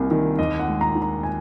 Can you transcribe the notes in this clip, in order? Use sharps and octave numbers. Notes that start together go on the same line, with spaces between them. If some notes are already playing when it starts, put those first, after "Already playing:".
Already playing: C2 A#3 G#5
D#3
D#2 D#5
F#5
G#3
A#5
D#3
A#5
G#5